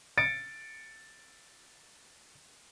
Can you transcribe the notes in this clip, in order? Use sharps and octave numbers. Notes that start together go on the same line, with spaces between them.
A6 C#7 D7